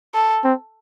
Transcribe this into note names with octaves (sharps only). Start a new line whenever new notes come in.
A4
C4